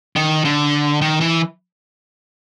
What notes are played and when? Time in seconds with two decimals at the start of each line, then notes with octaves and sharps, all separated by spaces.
0.16 D#3
0.45 D3
1.01 D#3
1.21 E3